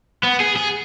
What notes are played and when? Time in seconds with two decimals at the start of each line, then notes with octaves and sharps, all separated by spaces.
0.23 B3
0.40 G#4
0.56 G#4